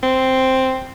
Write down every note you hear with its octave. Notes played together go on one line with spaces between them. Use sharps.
C4